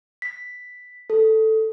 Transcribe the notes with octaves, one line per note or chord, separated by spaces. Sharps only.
B6
A4